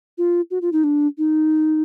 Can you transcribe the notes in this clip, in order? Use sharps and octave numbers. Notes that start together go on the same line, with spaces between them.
F4
F#4
F4
D#4
D4
D#4